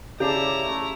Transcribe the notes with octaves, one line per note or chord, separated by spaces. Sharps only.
C#3 E4 G4 G#4 D5 A5 A#5
A3